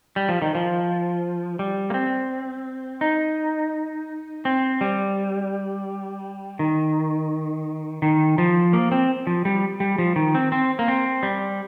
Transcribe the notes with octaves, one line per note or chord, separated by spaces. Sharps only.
G3
F3
D#3
F3
G3
A#3
C4
D#4
C4
G3
D#3
D#3
F3
A#3
C4
F3
G3
G3
F3
D#3
C4
C4
A#3
C4
G3